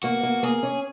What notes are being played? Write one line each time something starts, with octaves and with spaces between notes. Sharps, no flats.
A#3 F#4
A#3
A#3 G#4
C#4